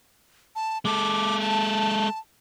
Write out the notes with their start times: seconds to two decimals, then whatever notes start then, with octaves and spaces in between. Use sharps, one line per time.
0.55 A5
0.85 G#3 A4 D6
1.40 A5